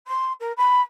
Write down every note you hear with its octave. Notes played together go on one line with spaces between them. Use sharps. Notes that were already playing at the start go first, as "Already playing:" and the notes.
C6
A#4
B5